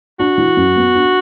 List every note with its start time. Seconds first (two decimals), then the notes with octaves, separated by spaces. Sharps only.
0.19 D4 F#4
0.38 E3
0.57 F#2
0.76 B3
0.95 D4